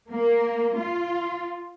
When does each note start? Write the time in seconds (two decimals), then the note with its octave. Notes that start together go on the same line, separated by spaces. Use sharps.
0.11 A#3
0.78 F4